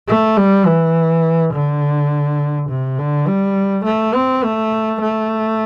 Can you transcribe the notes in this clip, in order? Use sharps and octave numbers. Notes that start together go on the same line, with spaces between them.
A3
G3
E3
D3
C3
D3
G3
A3
C4
A3
A3